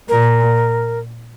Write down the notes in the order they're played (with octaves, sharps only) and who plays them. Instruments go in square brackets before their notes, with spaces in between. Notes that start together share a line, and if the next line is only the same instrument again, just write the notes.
[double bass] A#2 [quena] A#4